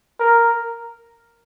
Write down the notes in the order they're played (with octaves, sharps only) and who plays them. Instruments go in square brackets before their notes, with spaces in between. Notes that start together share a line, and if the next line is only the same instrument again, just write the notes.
[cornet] A#4